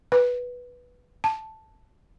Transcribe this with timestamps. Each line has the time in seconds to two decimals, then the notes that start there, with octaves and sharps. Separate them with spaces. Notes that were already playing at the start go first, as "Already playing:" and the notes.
0.12 B4
1.24 A5